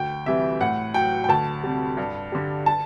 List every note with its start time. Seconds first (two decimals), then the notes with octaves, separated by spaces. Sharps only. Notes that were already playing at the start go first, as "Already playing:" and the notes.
Already playing: D2 G5
0.26 C3 E3 G3 E5
0.61 A2 F#5
0.94 F#3 G5
1.24 G5
1.29 D2 A5
1.63 C3 G3
1.97 G2
2.32 D3 G3
2.66 A5